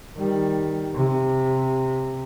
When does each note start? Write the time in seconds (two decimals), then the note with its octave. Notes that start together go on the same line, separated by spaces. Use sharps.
0.16 D#3 G3
0.94 C3